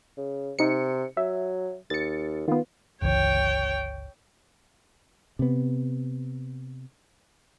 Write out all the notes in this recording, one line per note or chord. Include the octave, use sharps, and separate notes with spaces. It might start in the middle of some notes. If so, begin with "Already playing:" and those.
C#3
C3 D#4 C#7
F#3 E5
D#2 A6 C#7
D#3 B3 F4
G1 C#2 E3 C#5 G5
C3 B3